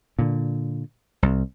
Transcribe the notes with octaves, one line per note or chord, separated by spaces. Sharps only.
A#2 D3
C2